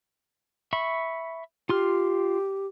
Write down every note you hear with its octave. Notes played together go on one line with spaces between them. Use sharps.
E5 B5 C#6
F4 G4 C6 F6